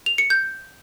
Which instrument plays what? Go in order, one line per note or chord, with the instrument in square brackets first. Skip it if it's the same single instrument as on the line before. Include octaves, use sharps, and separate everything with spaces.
[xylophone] F7
C#7
G6